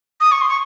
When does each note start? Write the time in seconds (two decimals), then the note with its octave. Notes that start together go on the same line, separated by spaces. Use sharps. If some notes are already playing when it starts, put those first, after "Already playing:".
0.21 D#6
0.32 C#6
0.41 C6
0.49 C#6